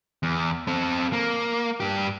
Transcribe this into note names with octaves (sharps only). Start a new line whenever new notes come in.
E2
C4 A4
A#3
G2 G4